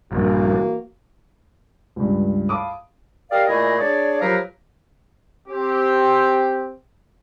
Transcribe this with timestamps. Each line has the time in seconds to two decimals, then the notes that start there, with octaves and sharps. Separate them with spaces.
0.12 A#1 G2 E3 A#3 F#4
1.96 C#2 G2
2.49 F5 A5 B5 D6 D#6
3.31 G4 A#4 D5 D#5 F5
3.48 A#2 A3 E4 G#4 D#5
3.79 D4 G#4 C#5 D5
4.21 F3 F#3 G4 A#4 B4 F5
5.48 C4 G4